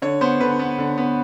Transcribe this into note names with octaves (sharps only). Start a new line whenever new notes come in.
D3 C#5
B3 C5
D3 B4
B3
D3
B3